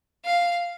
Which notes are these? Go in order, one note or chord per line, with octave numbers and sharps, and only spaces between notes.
F5